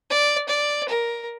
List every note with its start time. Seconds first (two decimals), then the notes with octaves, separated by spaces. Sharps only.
0.10 D5
0.48 D5
0.89 A#4